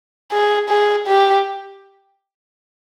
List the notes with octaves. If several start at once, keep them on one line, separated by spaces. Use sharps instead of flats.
G#4
G#4
G4